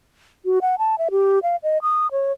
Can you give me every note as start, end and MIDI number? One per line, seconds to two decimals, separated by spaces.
0.45 0.59 66
0.62 0.76 78
0.79 0.95 81
0.99 1.09 76
1.11 1.39 67
1.43 1.56 77
1.63 1.78 75
1.82 2.07 87
2.12 2.32 73